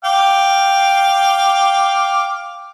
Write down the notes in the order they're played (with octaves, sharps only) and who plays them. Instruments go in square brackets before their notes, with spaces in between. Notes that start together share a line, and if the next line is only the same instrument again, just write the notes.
[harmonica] F5 G5 D6